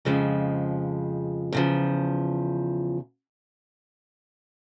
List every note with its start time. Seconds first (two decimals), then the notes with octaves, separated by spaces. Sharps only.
0.05 F2 C#3 F3 G#3
1.53 E2 C#3 F3